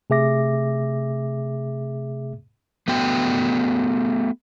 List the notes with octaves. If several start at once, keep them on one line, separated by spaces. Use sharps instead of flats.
C3 A3 G#4 E5 D6 A#6
A3 B3 F#4 G5